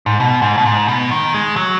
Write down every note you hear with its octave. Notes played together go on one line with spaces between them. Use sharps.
G#2
B2
G#2
B2
G#2
B2
D#3
G#3
F#3